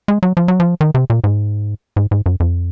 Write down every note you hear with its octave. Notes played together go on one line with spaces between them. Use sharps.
G#3
F#3
F3
F#3
F3
D#3
C3
A#2
G#2
G#2
G#2
F#2
F2